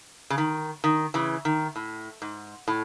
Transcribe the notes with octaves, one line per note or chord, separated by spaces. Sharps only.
C#3
D#3
D#3
C#3 E3
D#3
A2
G#2
A2